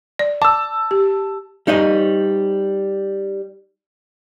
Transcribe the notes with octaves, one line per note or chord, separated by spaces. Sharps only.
D5
A5 D6 E6
G4
G3 D#4 C5 D#5